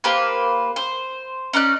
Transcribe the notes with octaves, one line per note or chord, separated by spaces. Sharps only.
A#3 G4 B4 C5
C5
C#4 D#4 D5 F#6